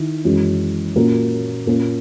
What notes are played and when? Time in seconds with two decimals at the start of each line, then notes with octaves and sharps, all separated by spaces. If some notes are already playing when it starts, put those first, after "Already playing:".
Already playing: D#3 E4
0.25 F#2 E3 G#3
0.96 A#2 A#3 C#4 F#4 A#4
1.67 A#2 A#3 C#4